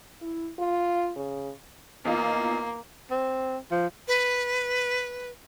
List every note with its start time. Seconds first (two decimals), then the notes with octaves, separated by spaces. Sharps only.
0.21 E4
0.59 F4
1.16 C#3
2.05 E2 A#3 D#4 F4
3.11 C4
3.71 F3
4.08 B4